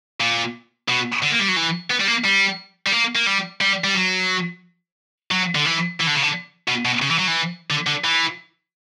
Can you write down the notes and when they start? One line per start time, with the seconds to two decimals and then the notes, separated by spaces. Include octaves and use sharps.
0.20 A#2
0.89 B2
1.22 D3
1.32 A#3
1.39 G3
1.49 F#3
1.57 E3
1.91 B3
2.01 G3
2.08 A#3
2.25 G3
2.87 G3
2.93 A#3
3.16 A#3
3.27 G3
3.61 G3
3.84 G3
3.95 F#3
5.31 F#3
5.55 D3
5.65 E3
6.00 E3
6.07 D3
6.15 C#3
6.22 D3
6.68 B2
6.85 B2
7.02 C#3
7.10 E3
7.19 F#3
7.27 E3
7.70 D3
7.87 D3
8.04 E3